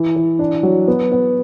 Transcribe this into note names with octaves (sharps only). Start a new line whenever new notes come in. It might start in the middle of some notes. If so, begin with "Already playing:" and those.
Already playing: E3
E3
D4
F#3
B3
B3